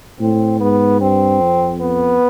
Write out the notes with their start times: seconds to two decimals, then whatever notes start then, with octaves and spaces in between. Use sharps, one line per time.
0.20 A2 C4
0.60 G#2 B3
1.00 G2 C4
1.41 F2
1.81 B3